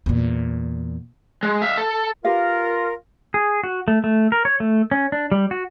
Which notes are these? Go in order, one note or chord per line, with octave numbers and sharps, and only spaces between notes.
E2 A#2
G#3
E5 F5
A4
F4 G4 A#4 B4 F5
G#4
F#4
A3
A3
A#4
C#5
A3
C#4
D4
G3
F#4